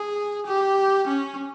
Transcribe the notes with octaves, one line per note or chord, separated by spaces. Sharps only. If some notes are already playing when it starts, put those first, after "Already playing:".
Already playing: G#4
G4
C#4